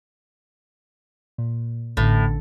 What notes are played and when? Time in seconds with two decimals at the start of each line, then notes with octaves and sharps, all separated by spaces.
1.38 A#2
1.97 A1 A2 D3